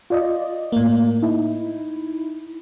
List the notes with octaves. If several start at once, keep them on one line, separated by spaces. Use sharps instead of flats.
F4 D5 D#5
A2 A#3
D#4 E4